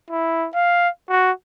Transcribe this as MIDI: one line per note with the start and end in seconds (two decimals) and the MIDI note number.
0.10 0.47 64
0.55 0.89 77
1.09 1.31 66